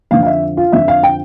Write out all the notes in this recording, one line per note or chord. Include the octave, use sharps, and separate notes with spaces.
F2 D3 F3 F5
F5
E5
F4
F2 D3 F3 E5
F5
G5